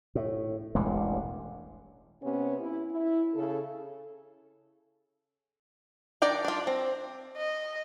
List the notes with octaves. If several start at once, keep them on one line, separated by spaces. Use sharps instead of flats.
A2
E1 A1 G2 G#3
C3 B3 C#4
E4
E4
C#3 A4
D#3 D4 D5 G5 A#5
D4 F4
C4
D#5